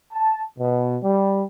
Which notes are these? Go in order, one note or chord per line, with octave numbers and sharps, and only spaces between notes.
A5
B2
G3